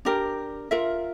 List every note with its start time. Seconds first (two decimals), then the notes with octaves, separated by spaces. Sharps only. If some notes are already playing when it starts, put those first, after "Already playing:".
0.05 D4 G4 A#4
0.71 F4 A#4 E5